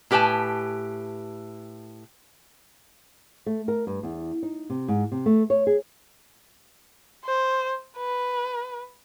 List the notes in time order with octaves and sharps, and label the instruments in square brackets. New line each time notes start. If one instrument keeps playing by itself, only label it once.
[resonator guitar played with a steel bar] A2 G4 B4 G#5 A5
[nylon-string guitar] A3
A#4
G2
E2
D#4
C3
G#2
C3
A3
C#5
G#4
[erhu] C5
B4